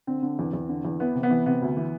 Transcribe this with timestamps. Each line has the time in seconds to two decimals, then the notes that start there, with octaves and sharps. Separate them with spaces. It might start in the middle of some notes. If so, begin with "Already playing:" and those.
0.07 D3 C4
0.23 D3
0.39 E2
0.53 E2
0.69 D3
0.85 E2
1.00 E3 B3
1.15 C3
1.23 B3
1.30 E3
1.46 C3 B3
1.62 D2
1.77 E3